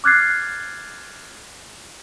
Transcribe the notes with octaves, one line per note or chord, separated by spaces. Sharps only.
D6 F6 F#6 G#6 A6 C7